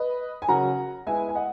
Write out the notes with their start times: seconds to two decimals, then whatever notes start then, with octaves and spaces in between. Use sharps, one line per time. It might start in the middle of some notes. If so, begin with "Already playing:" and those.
Already playing: B4 D#5
0.42 G#5
0.48 C#3 F#3 C#4 F#4 A#4 F#5 A#5
1.06 G#3 B3 E4 B4 E5 G#5
1.29 G#5
1.35 D#5 F#5